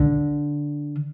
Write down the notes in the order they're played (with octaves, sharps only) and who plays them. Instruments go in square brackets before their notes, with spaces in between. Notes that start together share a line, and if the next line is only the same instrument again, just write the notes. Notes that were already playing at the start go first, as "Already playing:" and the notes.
Already playing: [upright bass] D3